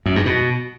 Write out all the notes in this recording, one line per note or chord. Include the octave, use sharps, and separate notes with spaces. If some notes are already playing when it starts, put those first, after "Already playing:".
F#2
G2
B2